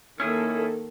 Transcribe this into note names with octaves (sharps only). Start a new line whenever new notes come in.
D#3 A#3 C#4 E4 G#4 A4